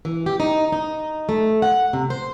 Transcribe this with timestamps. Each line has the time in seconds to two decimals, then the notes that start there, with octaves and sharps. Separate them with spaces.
0.05 E3
0.26 G4
0.40 D#4
0.72 D#4
1.29 A3
1.62 F#5
1.93 C3
2.10 C5